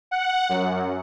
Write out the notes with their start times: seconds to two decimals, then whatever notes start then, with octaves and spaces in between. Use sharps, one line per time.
0.11 F#5
0.49 F#2